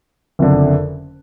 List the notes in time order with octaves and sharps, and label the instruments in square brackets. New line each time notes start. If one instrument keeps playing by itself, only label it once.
[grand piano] F#1 F2 D3